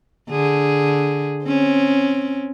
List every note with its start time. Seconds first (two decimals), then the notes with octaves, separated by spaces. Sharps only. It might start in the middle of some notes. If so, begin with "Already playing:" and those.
0.30 D3 G#4
1.44 C4 C#4